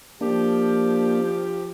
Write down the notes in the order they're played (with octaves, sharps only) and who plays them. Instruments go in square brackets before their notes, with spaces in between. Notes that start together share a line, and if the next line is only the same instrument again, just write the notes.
[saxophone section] F3 G4 [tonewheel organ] A#3 D4